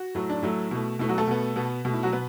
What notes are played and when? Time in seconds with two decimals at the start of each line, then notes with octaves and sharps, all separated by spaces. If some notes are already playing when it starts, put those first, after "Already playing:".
Already playing: F#4
0.15 A2 F#3 A3
0.30 D4
0.43 A2 F#3 A3 E4
0.71 B2 A3
0.99 B2 A3 E4
1.09 F#3 F#4
1.18 A3 A4
1.27 B2 B3
1.56 B2 B3
1.85 B2 A3
1.93 E4
2.03 F#3 F#4
2.13 B2 B3 B4